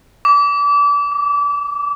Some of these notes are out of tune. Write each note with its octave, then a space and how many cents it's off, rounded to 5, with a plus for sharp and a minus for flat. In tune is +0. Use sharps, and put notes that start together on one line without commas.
D6 -30
D6 +10